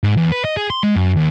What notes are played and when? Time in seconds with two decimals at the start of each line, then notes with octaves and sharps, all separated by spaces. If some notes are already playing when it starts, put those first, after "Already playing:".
0.04 G#2
0.17 E2
0.32 B4
0.45 D#5
0.57 G#4
0.70 C6
0.83 G#3
0.95 F#2
1.16 D#2